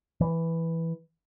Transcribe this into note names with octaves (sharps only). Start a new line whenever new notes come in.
E3